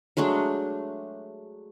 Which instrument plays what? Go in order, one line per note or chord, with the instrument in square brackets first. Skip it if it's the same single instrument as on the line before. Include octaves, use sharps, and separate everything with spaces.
[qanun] F#3 G#3 A3 D4